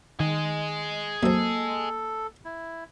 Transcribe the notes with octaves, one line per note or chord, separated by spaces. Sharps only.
D#3 G#4 D#5
F#2 A#3 C4 A4
E4